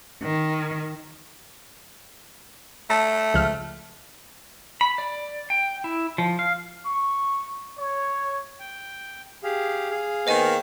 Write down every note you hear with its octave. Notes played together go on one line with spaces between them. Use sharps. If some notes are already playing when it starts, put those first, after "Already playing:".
D#3
A3 A5
C#2 F3 F6
B5
D5
G5
E4
F3
F5
C#6
C#5
G5
G4 G#4 F5
G#4 F5
D#3 A#3 B3 C5 D#5 G#5